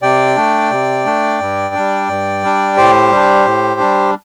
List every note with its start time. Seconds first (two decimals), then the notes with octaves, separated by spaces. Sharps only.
0.02 C3 D5 G5
0.36 A3 D4
0.71 C3
1.05 A3 D4
1.40 G2
1.74 G3 D4
2.09 G2
2.43 G3 D4
2.77 A2 G4 C5
3.12 G3 D4
3.46 A2
3.80 G3 D4